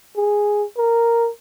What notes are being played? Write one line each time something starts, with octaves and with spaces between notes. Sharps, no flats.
G#4
A#4